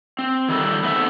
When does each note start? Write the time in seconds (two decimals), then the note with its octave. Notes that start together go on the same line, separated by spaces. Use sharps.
0.19 C4
0.48 D#3 G3 A4
0.83 A3 B3 C4 D#4 A4 E5